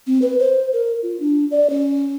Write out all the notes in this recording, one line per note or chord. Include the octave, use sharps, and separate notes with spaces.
C4
B4
C5
A#4
F4
D4
D5
C#4